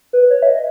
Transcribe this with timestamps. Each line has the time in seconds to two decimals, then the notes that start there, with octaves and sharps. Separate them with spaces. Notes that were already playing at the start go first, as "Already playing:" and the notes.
0.13 B4
0.30 C#5
0.42 E5
0.48 D#5